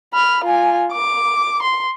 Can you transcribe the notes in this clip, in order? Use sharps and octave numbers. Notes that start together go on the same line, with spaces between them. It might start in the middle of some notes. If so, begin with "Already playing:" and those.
B5 F6
F4 G#5
D6
C6